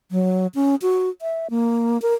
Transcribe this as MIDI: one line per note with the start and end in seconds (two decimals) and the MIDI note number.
0.11 0.47 54
0.55 0.75 61
0.82 1.09 66
1.22 1.47 76
1.50 2.01 58
2.02 2.14 70